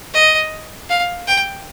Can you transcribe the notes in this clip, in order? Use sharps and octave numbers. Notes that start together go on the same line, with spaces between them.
D#5
F5
G5